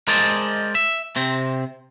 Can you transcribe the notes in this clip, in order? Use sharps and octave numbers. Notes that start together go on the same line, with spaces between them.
G#3 A#4 C5 D5 D#5 A5
E5
C3 C4